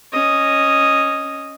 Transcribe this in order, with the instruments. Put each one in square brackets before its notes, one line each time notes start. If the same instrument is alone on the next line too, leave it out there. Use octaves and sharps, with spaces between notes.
[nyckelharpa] C#4 D#5